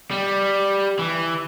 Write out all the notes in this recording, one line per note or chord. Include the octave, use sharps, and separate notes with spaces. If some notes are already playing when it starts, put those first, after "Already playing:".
G3
E3